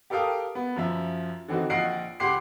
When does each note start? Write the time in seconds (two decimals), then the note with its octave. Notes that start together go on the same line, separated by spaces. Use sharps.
0.10 G4 A4 A#4 F5 G5 D#6
0.55 B3
0.76 F#2 F3 E5
1.48 D3 E3 C4 D#4 F#4
1.70 A#1 F4 D#5 F#5 C7 D7
2.20 C#2 G4 F#5 C6 D6 C7